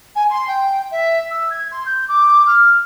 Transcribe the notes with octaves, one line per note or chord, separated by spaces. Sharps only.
G#5
C6
G5
E5
E6
G#6
C6
G6
D6
F6